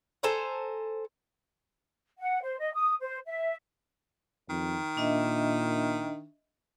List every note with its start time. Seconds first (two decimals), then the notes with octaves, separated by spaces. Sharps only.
0.23 A4 C5 G#5 A#5
2.18 F#5
2.42 C5
2.59 D#5
2.73 D#6
3.00 C5
3.26 E5
4.50 F2 D#3
4.97 A#2 D4 D#5 E5